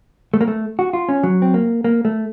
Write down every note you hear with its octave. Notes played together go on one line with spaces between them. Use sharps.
A3
A#3
A3
F#4
F4
C#4
F#3
C4
A#3
A#3
A3